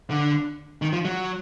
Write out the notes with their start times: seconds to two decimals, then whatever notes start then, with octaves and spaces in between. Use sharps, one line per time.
0.10 D3
0.82 D#3
0.93 F3
1.05 F#3